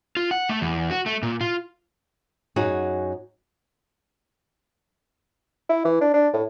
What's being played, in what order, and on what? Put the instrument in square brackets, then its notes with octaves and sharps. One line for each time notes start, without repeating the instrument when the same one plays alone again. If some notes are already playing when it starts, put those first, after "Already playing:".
[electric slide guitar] F4
F#5
A3
E2
F#4
A3
A#2
F4
[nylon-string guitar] F#2 D#4 F#4 G#4
[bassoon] E4
E3
D4
D4
A2